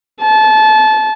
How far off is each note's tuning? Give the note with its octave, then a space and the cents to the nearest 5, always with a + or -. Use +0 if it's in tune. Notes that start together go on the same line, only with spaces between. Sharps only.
A5 -25